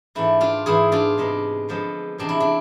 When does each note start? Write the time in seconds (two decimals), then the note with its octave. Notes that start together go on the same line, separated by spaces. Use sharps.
0.15 G#2 E3 A3 D4 E4
0.41 D4 F4
0.66 G#2 E3 B3 E4 G#4
0.92 D4 F4
1.18 C3 G#3 B3 D4
1.69 D3 F3 G#3 B3
2.18 E2 C3 G#3 C4 D4
2.29 E4
2.40 D4